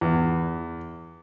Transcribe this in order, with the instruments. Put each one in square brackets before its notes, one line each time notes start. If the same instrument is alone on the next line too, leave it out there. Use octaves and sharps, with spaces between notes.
[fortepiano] E2